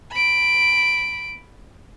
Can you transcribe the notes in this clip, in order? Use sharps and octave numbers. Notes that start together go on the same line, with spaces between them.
B5 D7